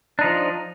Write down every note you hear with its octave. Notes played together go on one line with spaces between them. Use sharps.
F3 D4 D#4